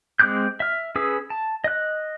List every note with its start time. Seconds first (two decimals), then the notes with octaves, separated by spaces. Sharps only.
0.19 G#3 C4 D6 F#6 G6
0.60 E5 F6
0.95 C#4 G#4 B4 D#6 E6
1.30 A5
1.64 D#5 F#6